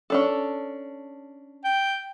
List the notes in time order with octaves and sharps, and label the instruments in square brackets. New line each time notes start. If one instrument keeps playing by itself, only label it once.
[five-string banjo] C#4 D4 A4
[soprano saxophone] G5